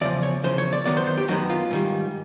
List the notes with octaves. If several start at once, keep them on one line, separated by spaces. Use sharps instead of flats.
E2 C#3 F3 D5
C#5
E2 C#3 F3 C5
C#5
D5
F#2 D#3 F#3 B3 D5
C5
C5
G4
F#2 D#3 F#3 B3 F#4
F4
G#2 D#3 G3